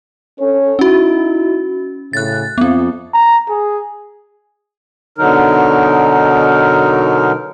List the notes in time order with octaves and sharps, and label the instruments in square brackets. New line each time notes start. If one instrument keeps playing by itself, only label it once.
[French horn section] C#4 A4 C#5
[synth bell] C#4 F#4 [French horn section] D#4 E4
[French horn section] A2 C#3 [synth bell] F#6 A6
[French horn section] F2 [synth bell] B3 C4
[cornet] A#5
G#4
[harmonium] B2 D3 F#3 D#4 A#4